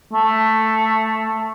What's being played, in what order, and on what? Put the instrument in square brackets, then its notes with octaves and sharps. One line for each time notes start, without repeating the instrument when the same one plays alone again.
[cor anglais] A3